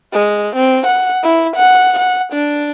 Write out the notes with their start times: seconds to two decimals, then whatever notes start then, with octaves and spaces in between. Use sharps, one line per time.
0.13 G#3
0.56 C4
0.86 F#5
1.23 E4
1.56 F#5
1.99 F#5
2.33 D4